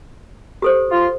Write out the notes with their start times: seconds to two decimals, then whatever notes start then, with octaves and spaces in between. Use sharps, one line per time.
0.62 G4 A4 C5
0.90 F4